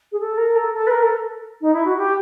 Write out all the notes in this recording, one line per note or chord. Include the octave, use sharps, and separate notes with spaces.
G#4
A4
A#4
A4
A4
B4
A#4
A4
D#4
E4
F#4
G4